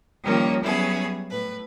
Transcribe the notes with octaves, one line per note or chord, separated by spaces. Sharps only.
D#3 F3 G3 A#3 C#4
F#3 G3 B3 C#4 E4 G#4
A2 B4